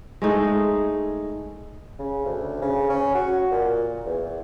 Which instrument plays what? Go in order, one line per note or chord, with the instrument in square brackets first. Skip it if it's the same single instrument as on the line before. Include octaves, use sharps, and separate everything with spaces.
[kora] G#3 A3 D#4
[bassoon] C#3
D2
C#3
C#4
F#4
A#2
E2